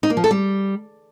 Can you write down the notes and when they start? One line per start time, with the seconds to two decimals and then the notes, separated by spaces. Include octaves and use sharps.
0.03 D#4
0.10 A#3
0.17 F3
0.24 A4
0.31 G3